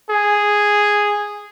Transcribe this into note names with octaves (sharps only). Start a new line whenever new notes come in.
G#4